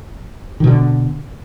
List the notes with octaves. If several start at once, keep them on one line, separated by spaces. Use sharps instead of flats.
B2 D3 D#3